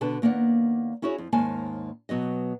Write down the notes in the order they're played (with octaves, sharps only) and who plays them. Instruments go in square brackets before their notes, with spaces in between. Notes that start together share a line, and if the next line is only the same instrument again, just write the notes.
[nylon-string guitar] B2 D3 B4 A5
D#2 A#3 B3 D5 F#5
C#4 E4 F#4 G#4 C#5
F2
D#2 G#2 A#3 C#4 G#5 A5
B2 F#3 B3 D#5